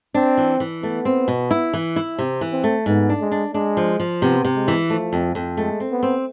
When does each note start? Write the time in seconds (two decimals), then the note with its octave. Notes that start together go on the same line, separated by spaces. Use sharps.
0.14 C4 D4
0.37 E3
0.60 E3
0.83 A3 B3
1.05 C4
1.28 B2
1.51 E4
1.74 E3
1.96 E4
2.18 C3 C4
2.41 E3
2.53 C4
2.64 A3
2.86 G#2 B3
3.09 D4
3.20 G#3
3.32 D4
3.54 G#3 D4
3.77 F3
4.00 F3
4.22 C3 B3
4.45 C3
4.56 G#3
4.68 E3
4.90 F3 A3
5.13 F2
5.35 F2
5.57 G#3 A3
5.80 C4
5.92 B3
6.03 C4